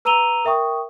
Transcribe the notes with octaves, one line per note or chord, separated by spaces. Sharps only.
B4 A#5 E6 D#7 F7 G7
A#4 E5 G5 C#6 D#6